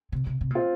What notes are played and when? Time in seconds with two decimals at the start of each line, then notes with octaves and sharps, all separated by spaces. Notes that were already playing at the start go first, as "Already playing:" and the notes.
0.12 C3
0.27 C3
0.41 C3
0.50 A#2 C4 F4